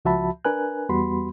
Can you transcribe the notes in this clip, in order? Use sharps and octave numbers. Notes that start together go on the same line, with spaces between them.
C#2 F3 F#4 E5 A5 B5
D4 A#4 B4 G#5 F#6
E2 G3 B3 F#4 B5 C6